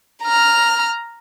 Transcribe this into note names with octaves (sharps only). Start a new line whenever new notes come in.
A#5 F6